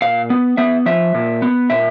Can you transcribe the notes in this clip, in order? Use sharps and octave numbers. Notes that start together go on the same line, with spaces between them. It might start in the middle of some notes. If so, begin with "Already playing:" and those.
A#2 F5
B3
B3 E5
F3 E5
A#2
B3
A#2 E5